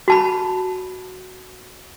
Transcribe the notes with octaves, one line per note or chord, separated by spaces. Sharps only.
F#4 A5 B5